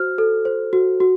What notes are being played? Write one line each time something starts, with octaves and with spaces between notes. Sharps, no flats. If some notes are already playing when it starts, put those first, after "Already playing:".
Already playing: F#4 C5 F6
A4
C5
F#4
F#4